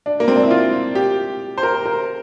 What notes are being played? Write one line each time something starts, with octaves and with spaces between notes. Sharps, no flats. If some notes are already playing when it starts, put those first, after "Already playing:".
D4
A#3
C4
D4
E4
F4
G4
C5
A#4
A#4